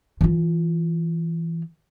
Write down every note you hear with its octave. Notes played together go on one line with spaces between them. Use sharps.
E3 F4